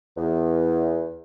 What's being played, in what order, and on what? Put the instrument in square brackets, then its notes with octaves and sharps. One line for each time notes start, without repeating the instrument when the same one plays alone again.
[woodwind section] E2